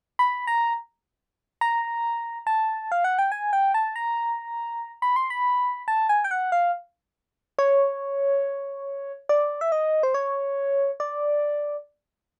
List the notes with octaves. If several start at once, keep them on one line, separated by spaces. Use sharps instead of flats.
B5
A#5
A#5
A5
F5
F#5
G5
G#5
G5
A5
A#5
B5
C6
B5
A5
G#5
G5
F#5
F5
C#5
D5
E5
D#5
C5
C#5
D5